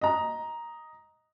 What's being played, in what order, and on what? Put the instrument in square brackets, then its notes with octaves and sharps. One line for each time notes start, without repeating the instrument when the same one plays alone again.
[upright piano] D#5 A#5